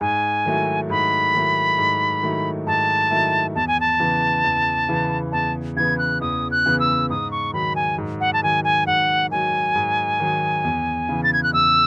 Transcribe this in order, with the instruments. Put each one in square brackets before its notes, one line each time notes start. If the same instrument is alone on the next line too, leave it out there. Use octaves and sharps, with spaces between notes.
[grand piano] G#2 [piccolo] G#5
[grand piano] D#3 F#3 A3 E4
[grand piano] G#2 [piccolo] B5
[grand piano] D#3 F#3 A3 E4
G#2
D#3 F#3 A3 E4
[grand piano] G#2 [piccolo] A5
[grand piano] D#3 F#3 A3 E4
[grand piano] E2 [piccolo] A5
[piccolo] G#5
A5
[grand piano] C#3 E3 B3
E2
C#3 E3 B3
[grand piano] E2 [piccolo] A5
[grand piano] C#3 E3 B3 [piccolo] G#6
[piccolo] F#6
[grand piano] E2 [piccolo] D#6
[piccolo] F#6
[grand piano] C#3 E3 B3
[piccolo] E6
[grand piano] G#2 [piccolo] D#6
[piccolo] C#6
[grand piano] D#3 F#3 [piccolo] B5
[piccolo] G#5
[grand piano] G#2
[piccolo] F#5
A5
[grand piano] D#3 F#3 [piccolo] G#5
[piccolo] G#5
[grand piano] G#2 [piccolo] F#5
[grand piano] D#3 F#3 [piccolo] G#5
[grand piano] G#2
D#3 F#3
E2
C#3 E3
[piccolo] A6
G#6
F#6
[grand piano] E2 [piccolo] E6